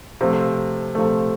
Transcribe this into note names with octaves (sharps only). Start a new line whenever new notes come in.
C3 F3 A3
C3 F3 A3